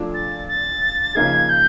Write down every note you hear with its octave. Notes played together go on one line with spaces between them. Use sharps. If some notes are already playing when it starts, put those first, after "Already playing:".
Already playing: A#2 F3 A3 D4
A6
A6
C#3 F3 A#3 D#4 G#4 G#6
G6